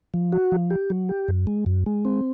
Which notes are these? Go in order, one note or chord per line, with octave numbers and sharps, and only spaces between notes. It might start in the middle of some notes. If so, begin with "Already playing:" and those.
F3
F#4
F3
G4
F#3
G4
F#2
G#3
F#2
G#3
C4